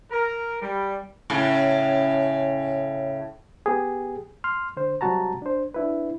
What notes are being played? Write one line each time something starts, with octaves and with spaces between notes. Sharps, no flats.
A#4
G3
A2 C#3
B3 G4 G#4
C6 F6
D3 C5
C3 F#3 G3 F#4 A5 A#5
D4 C5
D4 E4 B4